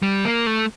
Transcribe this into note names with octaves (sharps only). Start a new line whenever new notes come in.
G3
A#3
A3